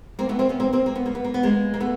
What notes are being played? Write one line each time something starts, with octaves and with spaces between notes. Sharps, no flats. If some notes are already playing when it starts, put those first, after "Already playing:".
A#3 C4
A3 B3
A#3 C4
B3 C#4
A#3 C4
A#3 C4
A#3
B3
A#3
B3
A#3
B3
G#3 A#3
A#3
A3 B3